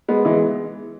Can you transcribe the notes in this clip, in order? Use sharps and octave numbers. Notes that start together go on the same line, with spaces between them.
G#3 B3
E3 G#3